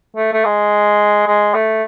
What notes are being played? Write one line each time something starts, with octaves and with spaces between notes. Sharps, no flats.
A3
A3
G#3
G#3
A3